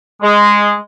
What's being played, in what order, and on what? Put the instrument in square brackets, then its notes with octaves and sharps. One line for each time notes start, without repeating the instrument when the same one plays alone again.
[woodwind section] G#3